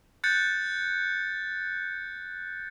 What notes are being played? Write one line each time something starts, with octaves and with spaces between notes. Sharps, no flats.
F#6 G6 A6 C#7